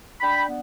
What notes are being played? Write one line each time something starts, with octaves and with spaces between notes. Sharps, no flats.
D4 G5 B5
B3